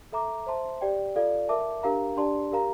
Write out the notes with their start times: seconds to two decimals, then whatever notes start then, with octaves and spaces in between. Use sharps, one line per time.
0.12 A4 E5 A#5 D6
0.46 C5 E5 A5 C6
0.81 G4 D5 G5
1.16 F4 A4 D5 F5
1.49 A#4 E5 A5 D6
1.83 D4 G4 A#4 F5 A#5
2.17 D4 G4 D5 A5 C6
2.52 G4 A#4 F5 A#5